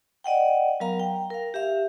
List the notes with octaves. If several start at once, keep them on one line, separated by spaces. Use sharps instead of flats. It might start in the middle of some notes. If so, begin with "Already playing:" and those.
D5 D#5 F#5 G5
F#3 B3 A#4 F5 A#5
G5
A#4 F5
G4 E5 F5